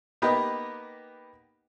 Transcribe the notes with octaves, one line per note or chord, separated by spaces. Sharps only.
A#3 B3 D#4 G4 B4 D#5